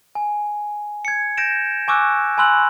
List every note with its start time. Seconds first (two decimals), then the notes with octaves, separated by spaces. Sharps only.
0.15 G#5
1.05 G#6 C#7
1.37 G6 A#6 D7 E7
1.88 G#5 C#6 D6 E6 F#6
2.38 G#5 B5 C6 E6 F#6 F#7